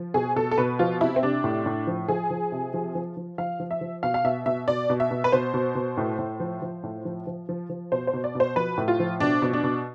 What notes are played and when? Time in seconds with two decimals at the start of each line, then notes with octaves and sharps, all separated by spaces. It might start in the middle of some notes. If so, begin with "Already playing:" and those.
Already playing: F3
0.14 B2 G#4
0.36 B2 A4
0.51 A4
0.58 B2 B4
0.79 F3 F4
1.01 C3 E4
1.16 C4
1.23 C3 D4
1.44 A2
1.66 A2
1.87 F3
2.08 F3 G#4
2.30 F3
2.52 C3
2.74 F3
2.95 F3
3.17 F3
3.38 F3 F5
3.60 F3
3.71 E5
3.81 F3
4.03 B2 F5
4.14 F5
4.24 B2 E5
4.46 B2 E5
4.68 B2 D5
4.90 B2
5.00 E5
5.11 B2
5.24 B4
5.32 B2 C5
5.54 B2
5.75 B2
5.97 A2
6.19 A2
6.40 F3
6.62 F3
6.83 A2
7.05 F3
7.27 F3
7.49 F3
7.70 F3
7.92 B2 C5
8.07 C5
8.13 B2
8.24 D5
8.35 B2 C5
8.56 F3 B4
8.78 A2
8.88 F4
9.00 F3
9.20 B2 D4
9.42 B2
9.53 D4
9.64 B2